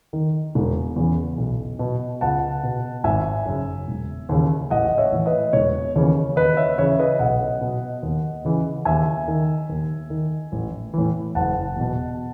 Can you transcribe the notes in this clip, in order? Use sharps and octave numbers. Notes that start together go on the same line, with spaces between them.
D#3
E1
E2 C#3 E3
B1
B2
C#2 F#5 A5
B2
G#1 E5 G#5
F#2 C#3
E1
D#2 C#3 E3
A1 D#5 F#5
C#5 E5
A2 E3
B4 D#5
E1 C#5
D#2 C#3 E3 C#5
D#2 B4 D#5
C#5 E5
C#3 E3 C#5 E5
B4 D#5
B1 D#5 F#5
B2
D#2
C#3 E3
D#2 E5 G#5
D#3
D#2
D#3
A1
A2 E3
F#1 F#5 A5
E2 B2